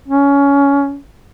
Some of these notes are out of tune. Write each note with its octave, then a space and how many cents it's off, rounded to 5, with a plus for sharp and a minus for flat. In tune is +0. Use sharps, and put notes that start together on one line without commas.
C#4 +20